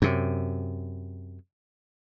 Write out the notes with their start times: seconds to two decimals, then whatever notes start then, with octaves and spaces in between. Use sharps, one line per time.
0.02 F#2 C3